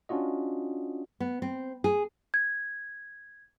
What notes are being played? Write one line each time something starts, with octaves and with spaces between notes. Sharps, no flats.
C#4 D4 F4 F#4 D#5
B3
C4
G#4
G#6